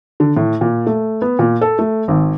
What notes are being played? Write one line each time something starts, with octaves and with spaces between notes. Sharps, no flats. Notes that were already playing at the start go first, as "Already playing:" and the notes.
D3
A2
A#2
A3
B3
A#2
A4
A3
G#1